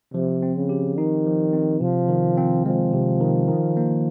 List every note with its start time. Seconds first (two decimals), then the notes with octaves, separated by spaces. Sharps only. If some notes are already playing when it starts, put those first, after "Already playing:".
0.14 C3 F3
0.43 C4
0.55 C#3
0.69 G4
0.98 D#3 D#4
1.26 F3
1.53 C4
1.81 C3 F3
2.09 D#3
2.37 C4
2.65 F3 G#3
2.93 C3
3.20 D#3
3.48 D#3
3.77 A#3